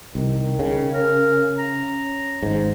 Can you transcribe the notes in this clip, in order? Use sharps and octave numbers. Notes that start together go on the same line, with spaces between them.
C2 D#3
C#3
C#4 A#4
A#5
G#1 G#2